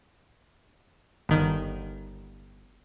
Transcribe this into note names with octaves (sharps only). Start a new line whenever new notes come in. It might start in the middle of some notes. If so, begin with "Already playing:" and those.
G1 D#3